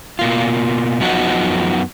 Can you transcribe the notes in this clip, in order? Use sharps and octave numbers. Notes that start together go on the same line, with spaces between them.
B2 A#3 F4
F#2 F3 B3 D#4 F#4